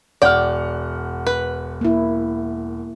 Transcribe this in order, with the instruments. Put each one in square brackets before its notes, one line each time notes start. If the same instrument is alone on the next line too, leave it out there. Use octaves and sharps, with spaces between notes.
[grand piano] E1 F#5 F6 [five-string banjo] D5 G5
[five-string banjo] B4
[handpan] A#3 E4